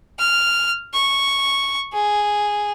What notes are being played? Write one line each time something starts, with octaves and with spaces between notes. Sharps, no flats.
F6
C#6
G#4